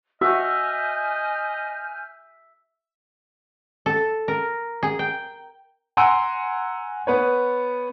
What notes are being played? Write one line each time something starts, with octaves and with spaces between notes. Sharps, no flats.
F#4 D#5 E5 G#5 F6 G6
A4
A#4
G#4
G5
F#5 G#5 A#5 C6 E6 D7
B3 B4 C#5